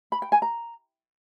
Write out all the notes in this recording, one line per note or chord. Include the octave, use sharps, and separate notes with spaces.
B5
G5
G#5
A#5